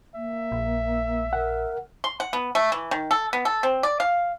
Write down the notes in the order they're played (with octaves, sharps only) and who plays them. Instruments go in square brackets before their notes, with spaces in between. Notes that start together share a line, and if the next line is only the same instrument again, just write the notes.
[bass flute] A#3 [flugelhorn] E5
[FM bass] A#1
[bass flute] A#4 [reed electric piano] F#5
[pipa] C6
F#5
B3
A3
E3
D#3
A4
B3
A4
C4
D5
F5